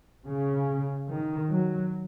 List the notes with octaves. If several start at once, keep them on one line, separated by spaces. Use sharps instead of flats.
C#3
D#3
F#3